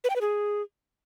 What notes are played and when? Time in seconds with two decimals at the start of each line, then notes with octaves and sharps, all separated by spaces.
0.04 B4
0.10 G5
0.16 B4
0.21 G#4